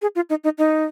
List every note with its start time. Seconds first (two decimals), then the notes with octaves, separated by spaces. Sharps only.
0.02 G#4
0.16 F4
0.30 D#4
0.44 D#4
0.58 D#4